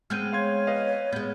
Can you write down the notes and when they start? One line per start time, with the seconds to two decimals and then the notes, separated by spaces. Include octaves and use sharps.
0.10 G#3 B3 C4 F6 G6 D#7
0.33 C#5 F5 C6 G#6
0.67 B4 D#5 F5
1.13 G#3 B3 F6 G6